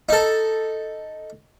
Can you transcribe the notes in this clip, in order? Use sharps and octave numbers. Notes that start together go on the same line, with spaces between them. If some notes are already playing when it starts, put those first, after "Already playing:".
D#4 A4